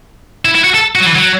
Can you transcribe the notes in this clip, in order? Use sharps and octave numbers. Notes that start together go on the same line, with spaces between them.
E4
E4
F#4
A4
F#4
F#3
E3
F#3